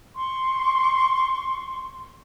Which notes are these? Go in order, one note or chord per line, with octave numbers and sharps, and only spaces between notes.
C6 C#6